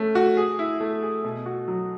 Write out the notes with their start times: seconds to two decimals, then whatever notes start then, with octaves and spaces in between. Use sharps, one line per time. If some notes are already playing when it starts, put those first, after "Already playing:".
Already playing: A3 C#4
0.15 F#4
0.37 G#4
0.59 E4
0.80 A3
1.03 G#4
1.24 B2
1.46 F#4
1.68 F#3